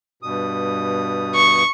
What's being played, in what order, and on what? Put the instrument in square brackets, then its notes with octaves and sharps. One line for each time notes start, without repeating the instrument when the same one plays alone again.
[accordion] G2 B2 D#6
[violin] C#6